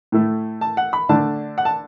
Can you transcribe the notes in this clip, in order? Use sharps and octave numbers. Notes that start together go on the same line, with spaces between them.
A2 A3 E4
A5
F#5
B5
D3 A3 D4 A5
F#5
A5